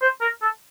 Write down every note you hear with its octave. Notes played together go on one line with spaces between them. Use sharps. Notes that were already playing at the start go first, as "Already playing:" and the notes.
C5
A#4
A4